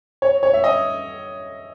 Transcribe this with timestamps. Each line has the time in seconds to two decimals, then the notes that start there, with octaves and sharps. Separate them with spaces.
0.22 C#5
0.43 C#5
0.54 E5
0.64 D#5